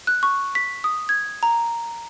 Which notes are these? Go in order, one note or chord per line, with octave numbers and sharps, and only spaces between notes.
F#6
C#6
B6
D#6
G#6
A#5